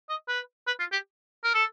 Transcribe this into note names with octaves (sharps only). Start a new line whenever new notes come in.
D#5
B4
B4
F4
G4
A#4
A4